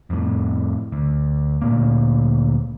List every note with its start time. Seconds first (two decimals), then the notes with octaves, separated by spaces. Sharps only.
0.10 F2 A2
0.92 D2
1.62 D2 A#2 A#3